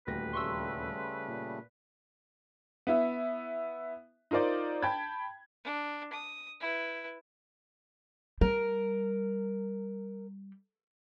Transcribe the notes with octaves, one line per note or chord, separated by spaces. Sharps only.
D#1 D2 B4 A#6
C#3 G3 A3 C6 C#6 E6
A#2
B3 E4 E5
D#4 F4 A#4 C5 D5
G5 A5 B5 G#6
D4
D#6
E4 B4
G3 A#4